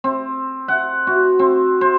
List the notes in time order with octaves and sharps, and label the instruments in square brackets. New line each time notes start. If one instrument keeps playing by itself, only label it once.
[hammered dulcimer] C4
F#5
F#4
C4
C5